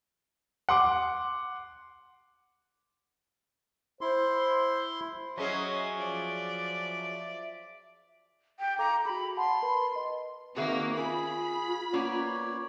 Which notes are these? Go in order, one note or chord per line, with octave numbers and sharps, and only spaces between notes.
F#5 C6 D6
E4 C5 C6
F#3 C#4 G#4 C#5 D#5 E5
F3 D5
G5
A4 F5 A#5 D6
F#4 G#4 B5
F#5 A5 B5 C6
A#4 B4 B5
B4 D#5
D#3 A#3 C4 F#4 G#4 E5
C#4 F4 G#4 B5
A#3 B3 C#4 C#5 D5